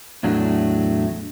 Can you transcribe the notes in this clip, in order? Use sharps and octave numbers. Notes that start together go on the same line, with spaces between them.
E2 A2 F#3 A3 D4